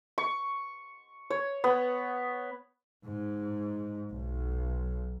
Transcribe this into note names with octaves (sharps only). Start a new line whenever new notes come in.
C#6
C#5
B3
G#2
B1